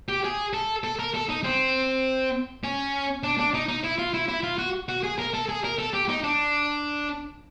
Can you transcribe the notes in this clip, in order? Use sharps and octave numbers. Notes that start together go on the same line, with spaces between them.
G4
G#4
A4
A4
A#4
A4
D#4
C4
C#4
D4
D4
D#4
D#4
E4
F4
E4
E4
F4
F#4
F#4
G#4
A#4
A4
G#4
A#4
A4
G4
D#4
D4